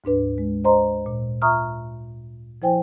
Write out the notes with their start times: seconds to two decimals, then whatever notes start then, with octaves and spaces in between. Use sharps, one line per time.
0.04 D2 G#2 D4 B4
0.38 G#3
0.64 C5 D#5 A#5 C6
1.06 A#2
1.42 F4 E5 A#5 C#6 D#6 F6
2.62 F3 E4 C5 G5 G#5